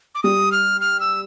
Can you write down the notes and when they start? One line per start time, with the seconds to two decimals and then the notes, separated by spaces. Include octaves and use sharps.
0.15 D6
0.23 G3 D#6
0.52 F6
0.81 F6
1.00 E6